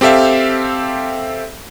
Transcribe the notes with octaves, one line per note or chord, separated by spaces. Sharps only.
C4 G4 A4 E5 F5